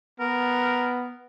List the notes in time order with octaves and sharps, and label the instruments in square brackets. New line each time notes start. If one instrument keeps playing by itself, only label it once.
[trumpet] B3 [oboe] A#4